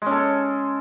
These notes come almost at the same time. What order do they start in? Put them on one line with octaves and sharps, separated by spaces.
G#3 C#4 A4